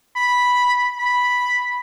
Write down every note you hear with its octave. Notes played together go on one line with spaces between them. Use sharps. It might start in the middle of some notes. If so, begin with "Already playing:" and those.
B5
B5